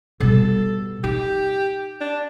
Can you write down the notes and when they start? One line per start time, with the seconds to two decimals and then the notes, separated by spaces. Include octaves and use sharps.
0.20 B2 G3 A4
1.04 D#4 G4
2.01 D4